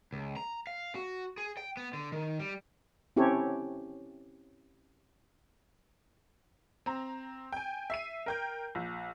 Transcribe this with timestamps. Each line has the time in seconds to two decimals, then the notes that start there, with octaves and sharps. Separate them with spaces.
0.13 C#2
0.37 A#5
0.67 F5
0.95 F#4
1.38 G#4
1.57 G5
1.77 B3
1.93 D3
2.12 D#3
2.39 G3
3.16 C4 C#4 E4 G4 A4 C#5
6.86 C4 A#5
7.53 G5 G#5
7.90 E5 C7 D#7
8.26 A#4 G5 G6
8.75 A#1